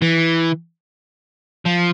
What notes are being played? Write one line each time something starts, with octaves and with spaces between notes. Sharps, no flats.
E3
F3